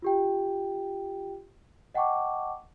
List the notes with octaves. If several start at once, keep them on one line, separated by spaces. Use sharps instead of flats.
F4 G4 G5
D#5 F#5 G5 A5 C#6 D6